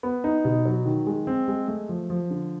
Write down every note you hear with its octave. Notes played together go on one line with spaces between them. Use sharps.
B3
D#4
B2
F#3
D#3
G#3
C4
G#3
A3
F3
F3
D3